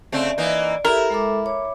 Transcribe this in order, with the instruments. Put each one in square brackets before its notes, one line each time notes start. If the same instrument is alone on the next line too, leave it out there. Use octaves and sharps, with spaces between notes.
[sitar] C#3 A3 C4 [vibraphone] D5
[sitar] E3 A#3 D#4
[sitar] E4 [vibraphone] G4 A4 E5 [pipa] A#4
[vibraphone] G#3 A4 D6
C#5 D6